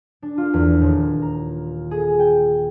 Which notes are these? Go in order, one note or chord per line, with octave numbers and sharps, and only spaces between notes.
D4
F4
E2
D#1
A#5
G#4
G5